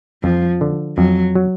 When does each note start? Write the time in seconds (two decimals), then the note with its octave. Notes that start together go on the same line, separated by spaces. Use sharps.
0.23 F2 F3
0.61 D3
0.97 F2 F#3
1.35 F#3